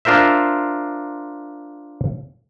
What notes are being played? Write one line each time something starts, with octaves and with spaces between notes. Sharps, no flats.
D4 F4 A#4 C5 E5